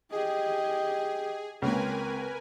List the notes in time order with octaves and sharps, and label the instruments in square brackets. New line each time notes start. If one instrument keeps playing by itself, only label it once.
[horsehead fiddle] G4 D#5 [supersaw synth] G#4
[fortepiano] C#2 A#3 [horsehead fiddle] C4 [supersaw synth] A#4 B4 G#5